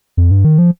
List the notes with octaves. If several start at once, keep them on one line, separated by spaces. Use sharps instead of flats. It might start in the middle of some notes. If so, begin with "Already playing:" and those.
F2
G2
D#3
F3